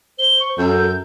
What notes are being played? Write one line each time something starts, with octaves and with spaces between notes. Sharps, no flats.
C5 G7
C#6
F#2 A4 G6